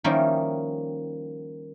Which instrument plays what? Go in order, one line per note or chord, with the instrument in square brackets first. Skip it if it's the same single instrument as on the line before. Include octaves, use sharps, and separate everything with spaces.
[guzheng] D#3 F3 G3 A#3 C#4 E4